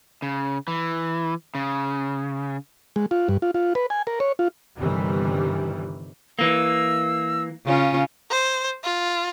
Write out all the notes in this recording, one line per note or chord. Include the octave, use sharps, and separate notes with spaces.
C#3
E3
C#3
G#3
F4
G2
F4
F4
B4
G#5
A#4
C#5
F4
G1 G2 C3 D#3 E3 G3
E3 A#3 E6
C#3 C#4 F4
C5
F4